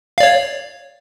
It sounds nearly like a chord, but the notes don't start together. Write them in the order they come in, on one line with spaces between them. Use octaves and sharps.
F5 D5 C#5